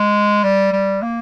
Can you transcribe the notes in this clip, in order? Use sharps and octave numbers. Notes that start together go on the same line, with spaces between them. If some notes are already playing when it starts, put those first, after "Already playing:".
Already playing: G#3
G3
G3
A#3